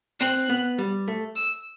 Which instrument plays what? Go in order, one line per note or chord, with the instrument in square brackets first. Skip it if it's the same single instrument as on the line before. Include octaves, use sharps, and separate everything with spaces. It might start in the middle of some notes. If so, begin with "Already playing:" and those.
[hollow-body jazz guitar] C4 [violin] F#6
[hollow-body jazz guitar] B3
G3
A3
[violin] E6